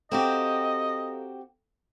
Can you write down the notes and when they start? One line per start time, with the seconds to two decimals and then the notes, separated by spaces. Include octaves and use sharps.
0.12 C4 F#4 G4 A4 D#5 F5 A#5